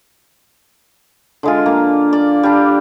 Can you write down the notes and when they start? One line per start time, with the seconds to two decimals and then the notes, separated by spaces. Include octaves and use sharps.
1.43 D3 G#3 F4
1.66 A#3
2.13 D5
2.43 G3 D4